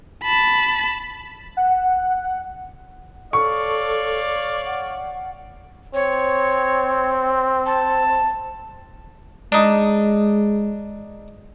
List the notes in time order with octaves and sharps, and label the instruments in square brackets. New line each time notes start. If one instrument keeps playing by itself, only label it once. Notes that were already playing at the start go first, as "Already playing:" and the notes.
[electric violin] A5 B5
[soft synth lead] F#5
[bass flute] A4 [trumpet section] C#5 D5 F5 [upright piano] C#6
[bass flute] F#5
[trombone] C4 [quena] C#5
[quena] A5
[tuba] G#3 [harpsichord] D4 D#4